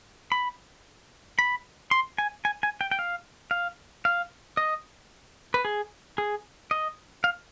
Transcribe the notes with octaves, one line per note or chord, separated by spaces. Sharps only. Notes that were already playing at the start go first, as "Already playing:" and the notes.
B5
B5
C6
G#5
G#5
G#5
G5
G5
F5
F5
F5
D#5
B4
G#4
G#4
D#5
F5